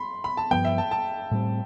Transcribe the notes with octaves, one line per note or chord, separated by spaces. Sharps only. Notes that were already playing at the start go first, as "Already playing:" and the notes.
Already playing: B5 C6
B5
A5
G2 F3 B3 G5
E5
A5
A5
A2 G3 C4